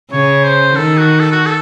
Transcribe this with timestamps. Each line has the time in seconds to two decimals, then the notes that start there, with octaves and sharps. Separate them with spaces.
0.11 C#3 C#5
0.44 C5
0.76 D#3 A4
0.98 F#4
1.20 A4
1.32 F#4
1.46 A4